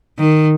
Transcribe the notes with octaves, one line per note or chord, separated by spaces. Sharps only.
D#3